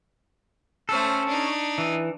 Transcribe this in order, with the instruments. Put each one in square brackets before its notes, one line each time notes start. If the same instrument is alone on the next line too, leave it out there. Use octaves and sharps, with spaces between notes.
[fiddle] A3 C5 [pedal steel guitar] C#4 A4
[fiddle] D4 D#4
[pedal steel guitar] E3